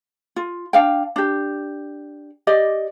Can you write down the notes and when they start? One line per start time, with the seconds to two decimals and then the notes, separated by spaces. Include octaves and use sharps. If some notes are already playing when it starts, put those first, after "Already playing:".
0.36 F4
0.73 D4 F5 G5
1.16 D4 G4
2.47 G4 D5 D#5